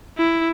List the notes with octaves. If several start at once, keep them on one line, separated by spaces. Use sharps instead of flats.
E4